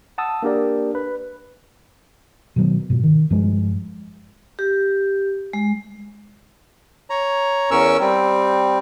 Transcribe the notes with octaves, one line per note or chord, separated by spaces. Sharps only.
F#5 A5 D#6 E6
A#3 D4 G4 A#4 D5
B4
B2 D#3 F#3 B3
G#2 B2
D#3
G2 F3 G#3
G4
G#3
C#5 A#5
E2 C#4 A#4 C#6 E6
G3 C4